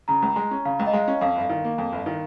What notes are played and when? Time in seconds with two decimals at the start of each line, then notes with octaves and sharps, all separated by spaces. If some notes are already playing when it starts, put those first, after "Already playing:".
0.08 C#3 A#5
0.22 C#2
0.36 G#3
0.51 C#4
0.65 C#3 F5
0.79 C#2
0.87 D#5
0.93 G#3 F5
1.08 C#4
1.21 F2 F5
1.36 G1 F5
1.49 D#3
1.64 A#3
1.78 F2
1.93 G1
2.06 D#3